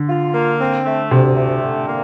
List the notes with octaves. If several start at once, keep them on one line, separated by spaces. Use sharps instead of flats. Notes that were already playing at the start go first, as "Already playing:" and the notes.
Already playing: D3
F4
A#3
C4
A3
D2 C3
A3
D3
A#3